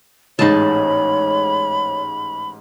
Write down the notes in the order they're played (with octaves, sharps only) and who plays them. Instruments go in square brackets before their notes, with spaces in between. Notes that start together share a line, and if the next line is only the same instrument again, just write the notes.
[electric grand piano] A1 G#2 A6 [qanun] D#4 G#4 A5 [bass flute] C#5 [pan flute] B5